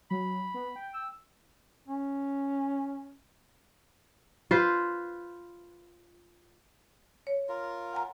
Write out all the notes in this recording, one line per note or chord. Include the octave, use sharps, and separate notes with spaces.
F#3 B5
B3
G5
E6
C#4
F4 B4 C5
C#5
F4 A#4
F#5 G#5 A#5